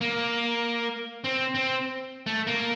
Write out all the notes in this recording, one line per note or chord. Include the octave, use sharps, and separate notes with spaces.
A#3
C4
C4
A3
A#3